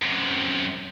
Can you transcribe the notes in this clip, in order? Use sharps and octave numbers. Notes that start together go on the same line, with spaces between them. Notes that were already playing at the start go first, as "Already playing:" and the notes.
F#2 C3